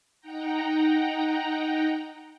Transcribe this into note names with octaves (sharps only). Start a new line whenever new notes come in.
D#4 F#5 G5 A#5